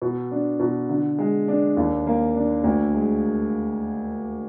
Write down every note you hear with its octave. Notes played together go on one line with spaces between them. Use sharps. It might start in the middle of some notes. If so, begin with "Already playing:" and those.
B2
D4
B2
D3
G#3
D4
D#2
A#3
D4
D2
G#3